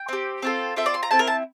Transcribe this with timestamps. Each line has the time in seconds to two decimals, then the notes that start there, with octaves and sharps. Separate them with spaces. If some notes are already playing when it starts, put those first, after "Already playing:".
Already playing: G5
0.09 C4 G4
0.42 C4 F4 A4
0.76 C4 F4 A4 E5
0.86 D5
0.94 C6
1.03 A#5
1.11 C4 E4 A4 A5
1.19 A#4
1.27 A5